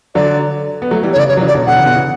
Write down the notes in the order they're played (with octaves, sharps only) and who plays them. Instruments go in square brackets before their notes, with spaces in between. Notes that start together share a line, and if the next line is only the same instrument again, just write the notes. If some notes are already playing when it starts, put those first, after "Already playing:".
[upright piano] D3 F#3 [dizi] D5
[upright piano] B3
F#3 A3
E3 G3
[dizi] C#5
[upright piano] C#3 E3 [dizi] D5
[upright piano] C#3 [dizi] C#5
[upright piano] F#3
C#3 E3
[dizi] D5
[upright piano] B2 D3
[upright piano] B2 D3 [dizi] F#5
[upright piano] C#3 E3
B2 D3
C#3 E3